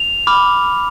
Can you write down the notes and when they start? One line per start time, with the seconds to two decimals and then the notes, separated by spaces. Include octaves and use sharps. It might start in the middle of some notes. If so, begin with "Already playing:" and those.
Already playing: F7
0.27 B5 D6 F6